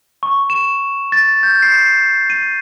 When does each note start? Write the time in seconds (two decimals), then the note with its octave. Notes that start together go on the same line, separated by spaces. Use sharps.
0.23 C#6
0.50 E7
1.12 A6
1.43 G6
1.62 C7
2.30 D#7